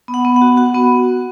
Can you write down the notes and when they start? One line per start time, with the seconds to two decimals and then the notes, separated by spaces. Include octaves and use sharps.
0.08 B3
0.14 F#5
0.25 B3
0.36 F#5
0.42 F#4
0.57 F#4 F#5
0.74 B3